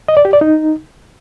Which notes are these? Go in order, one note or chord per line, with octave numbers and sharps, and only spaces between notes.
D#5
D5
G4
D5
D#4